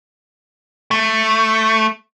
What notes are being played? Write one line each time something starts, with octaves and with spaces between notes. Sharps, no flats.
A3